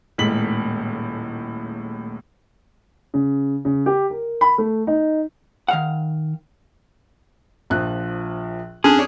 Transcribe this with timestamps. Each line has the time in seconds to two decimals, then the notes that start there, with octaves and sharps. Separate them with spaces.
0.18 D#1 A2 G#3 B6 F#7
3.14 C#3
3.65 C#3
3.86 G4
4.10 A#4
4.41 B5
4.58 A3
4.87 D#4
5.68 D#3 F5 F#5
7.70 A#1 F3 F#6
8.84 F2 C#4 D4 G#4 A5